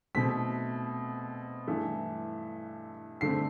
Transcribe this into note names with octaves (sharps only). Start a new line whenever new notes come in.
B2 A3 C4 B6
G2 E3 A3
G2 D3 A3 C4 C7